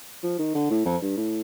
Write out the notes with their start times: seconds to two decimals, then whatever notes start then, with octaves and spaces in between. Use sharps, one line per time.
0.23 F3
0.39 D#3
0.55 D3
0.70 A2
0.86 F2
1.02 G2
1.17 A2